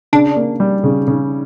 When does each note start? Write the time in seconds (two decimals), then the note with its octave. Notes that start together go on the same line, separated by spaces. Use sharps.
0.13 C#3 D4
0.36 A#3
0.60 G3
0.84 C#3
1.08 C#3